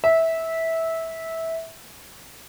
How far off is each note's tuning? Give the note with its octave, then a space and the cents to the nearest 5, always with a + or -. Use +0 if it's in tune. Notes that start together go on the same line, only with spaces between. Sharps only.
E5 -15